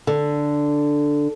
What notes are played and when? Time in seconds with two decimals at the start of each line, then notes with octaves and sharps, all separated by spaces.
0.07 D3